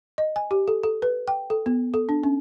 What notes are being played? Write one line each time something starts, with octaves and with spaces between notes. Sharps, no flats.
D#5
G#5
G4
A4
A4
B4
G5
A4
B3
A4
D4
C#4